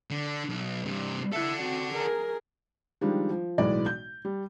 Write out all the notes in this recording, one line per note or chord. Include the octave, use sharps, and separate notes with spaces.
D3
B1
G2 C3
E4 A4 E5 F#5
C4 F#4
G#4 A#4
D#3 F3 G3 G#3 D4
F3
B1 A2 E3 G#3 D5
G6
G3